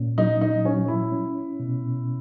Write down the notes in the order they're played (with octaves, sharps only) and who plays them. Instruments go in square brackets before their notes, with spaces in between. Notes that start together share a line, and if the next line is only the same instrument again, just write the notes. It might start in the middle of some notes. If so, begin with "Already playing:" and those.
Already playing: [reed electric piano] A#2 C#4
[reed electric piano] F#3 [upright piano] D#4
[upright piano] D#4
[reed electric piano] F#3 [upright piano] C#4
[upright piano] E4
[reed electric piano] C#4
B2